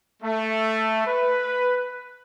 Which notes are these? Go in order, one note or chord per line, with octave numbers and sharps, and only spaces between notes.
A3
B4